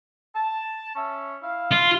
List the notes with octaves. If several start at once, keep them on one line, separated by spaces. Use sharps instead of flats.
A5
C#4 E5
E4 F5
F4